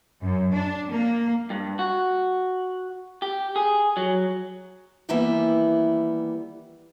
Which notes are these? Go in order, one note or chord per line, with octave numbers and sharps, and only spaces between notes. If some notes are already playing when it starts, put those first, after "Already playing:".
F#2
D4
A#3
G2
F#4
G4
G#4
F#3
D#3 E3 G3 A#3 B3 E4